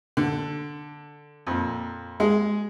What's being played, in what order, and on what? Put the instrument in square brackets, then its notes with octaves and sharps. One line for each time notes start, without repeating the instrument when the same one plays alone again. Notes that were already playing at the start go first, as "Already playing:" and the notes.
[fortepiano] D3
F2 A#2
G#3 G#4